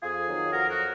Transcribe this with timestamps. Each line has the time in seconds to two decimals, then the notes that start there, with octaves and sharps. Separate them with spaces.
0.01 F2 F4 G#4
0.27 D#3 F#3
0.52 F2 F#4 A#4
0.69 F#4 A#4
0.77 F#3